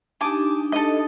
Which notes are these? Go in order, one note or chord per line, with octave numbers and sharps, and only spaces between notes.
D4 D#4 G4 G#5 A5 D6
A4 D#5